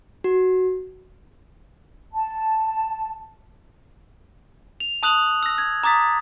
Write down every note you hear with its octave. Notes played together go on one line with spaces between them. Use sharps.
F#4
A5
F7
A5 D#6 F#6 F7 F#7
E6 A#6
G#6
A#5 D6 D#6 A6 B6